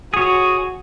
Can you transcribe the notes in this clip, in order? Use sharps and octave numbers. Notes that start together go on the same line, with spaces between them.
F#4 G#4 C#5